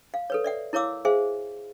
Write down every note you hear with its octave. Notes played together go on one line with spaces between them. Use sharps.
F5
A4 B4 C#5
D5 E5 F#5
E4 A#4 C#5 F5 D6 E6
G#4 C5 E5 F5 G#5